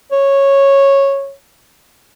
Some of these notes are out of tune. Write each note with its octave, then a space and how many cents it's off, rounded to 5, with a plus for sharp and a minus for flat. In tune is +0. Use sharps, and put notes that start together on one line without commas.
C#5 -10